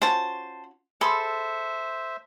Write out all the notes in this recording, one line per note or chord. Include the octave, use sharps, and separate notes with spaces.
C#4 F4 F#4 C5 A5
G#4 A4 C5 E5 B5 C6